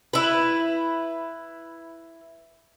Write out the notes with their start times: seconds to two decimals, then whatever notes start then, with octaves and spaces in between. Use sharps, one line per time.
0.13 E4 B4